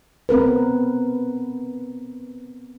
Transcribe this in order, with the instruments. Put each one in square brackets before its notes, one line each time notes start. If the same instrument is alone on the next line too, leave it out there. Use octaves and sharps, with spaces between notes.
[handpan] B3 C4 A#4 B4